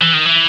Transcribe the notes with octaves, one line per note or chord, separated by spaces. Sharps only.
E3
D#3
E3